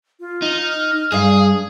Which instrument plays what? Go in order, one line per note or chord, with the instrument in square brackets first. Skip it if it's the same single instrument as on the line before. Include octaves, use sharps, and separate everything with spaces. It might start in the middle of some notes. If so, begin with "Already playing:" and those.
[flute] F4
[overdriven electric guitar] D#4
[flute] F6
[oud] G2 F5 [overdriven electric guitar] G#4 [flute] D#6